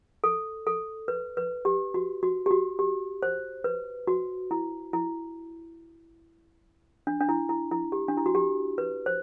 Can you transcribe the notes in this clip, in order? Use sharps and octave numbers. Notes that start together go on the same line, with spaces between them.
A4
A4
B4
B4
G4
F#4
F#4
G4
F#4
G4
C5
B4
F#4
E4
E4
D4
D4
E4
E4
E4
G4
D4
E4
F#4
G4
B4
C5